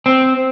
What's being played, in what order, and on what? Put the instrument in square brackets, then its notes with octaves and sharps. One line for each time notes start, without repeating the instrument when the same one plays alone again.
[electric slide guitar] C4